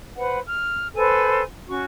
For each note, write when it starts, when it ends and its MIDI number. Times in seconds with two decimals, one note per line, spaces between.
0.17 0.38 71
0.17 0.38 72
0.17 0.38 78
0.45 0.87 89
0.95 1.42 69
0.95 1.42 71
0.95 1.42 72
0.95 1.42 80
1.68 1.85 61
1.68 1.85 66
1.68 1.85 85